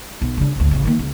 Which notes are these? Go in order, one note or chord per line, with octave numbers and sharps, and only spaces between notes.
B1
C#3 D4
G#1 D2
A1 C#3
D#3 A#3
C#2